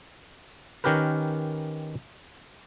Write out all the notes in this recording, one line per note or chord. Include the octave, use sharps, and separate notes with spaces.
D#3 C#4 G4 A#4 B4